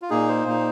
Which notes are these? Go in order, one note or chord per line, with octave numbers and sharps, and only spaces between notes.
F4
A#2 A#3 D#4 G#4
C5
A#2 A#3 D#4